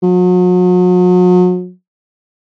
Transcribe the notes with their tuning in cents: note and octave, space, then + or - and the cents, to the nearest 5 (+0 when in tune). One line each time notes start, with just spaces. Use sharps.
F#3 -40